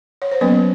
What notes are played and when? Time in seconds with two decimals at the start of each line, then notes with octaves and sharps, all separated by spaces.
0.22 C#5
0.31 C5
0.41 F#3 A#3 B3 C#4 B4